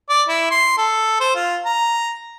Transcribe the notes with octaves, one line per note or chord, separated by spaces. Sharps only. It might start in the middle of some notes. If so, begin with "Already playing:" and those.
D5
E4
C6
A4
C5
F4
A#5